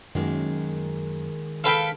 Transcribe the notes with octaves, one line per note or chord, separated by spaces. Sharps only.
F#2 D#3 G#3 A#3
A4 B4 F5 G5 B6